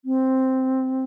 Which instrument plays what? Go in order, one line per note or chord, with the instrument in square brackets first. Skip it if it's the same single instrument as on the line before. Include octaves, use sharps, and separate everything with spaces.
[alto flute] C4